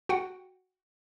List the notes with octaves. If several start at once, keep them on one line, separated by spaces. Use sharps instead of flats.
F#4 F#5 G5